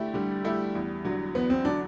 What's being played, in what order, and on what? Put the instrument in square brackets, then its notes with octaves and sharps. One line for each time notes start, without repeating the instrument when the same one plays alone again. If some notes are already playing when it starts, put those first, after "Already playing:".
Already playing: [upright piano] D3 A3 E4 G4
[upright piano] D3 [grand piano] G3
[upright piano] A3 E4 G4
E2
D3 F#3
[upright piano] E2 [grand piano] B3
[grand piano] C4
[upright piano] D3 F#3 [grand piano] D4